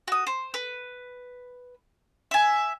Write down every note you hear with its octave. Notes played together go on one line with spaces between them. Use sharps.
F#4 D#6
C5
B4
E5 G#5